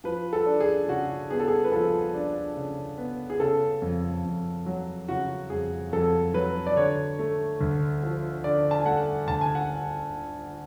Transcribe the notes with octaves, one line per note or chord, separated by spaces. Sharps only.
F3 B4
A4
D4
G#4
C#3 F#4
B3 G#4
A4
G#4
B4
F3 A4
D4
C#3
B3
G#4
C#3 A4
F2
F2
F#3
C#3 F#4
F2 G#4
F2 A4
F#3 B4
D5
D3 C#5
A3
D2
F3
D3 D5
A5
G#5
A3 F#5
D2 A5
G#5
F#5